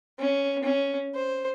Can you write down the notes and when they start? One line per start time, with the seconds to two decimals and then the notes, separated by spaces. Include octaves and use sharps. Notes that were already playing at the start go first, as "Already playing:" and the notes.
0.19 C#4
0.64 C#4
1.15 C5